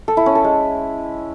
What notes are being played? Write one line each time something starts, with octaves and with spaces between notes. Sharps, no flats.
A4
E4
C#4
A4
G#3